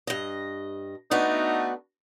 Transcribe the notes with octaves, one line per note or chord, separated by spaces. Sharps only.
G2 D#5
A3 B3 D4 D#4 F#4